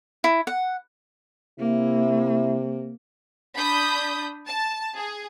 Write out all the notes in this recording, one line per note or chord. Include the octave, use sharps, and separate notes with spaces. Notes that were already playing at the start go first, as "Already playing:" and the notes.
E4
F#5
C3 A#3 E4
D4 B5 D#6 G6
A5
G#4